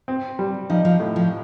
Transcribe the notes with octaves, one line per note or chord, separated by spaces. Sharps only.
C4
G3
F3 D#4
F3
A2
F3